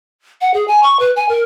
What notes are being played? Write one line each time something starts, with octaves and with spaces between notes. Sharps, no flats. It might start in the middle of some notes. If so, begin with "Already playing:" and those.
F#5
G#4
G#5
C#6
B4
G#5
A#4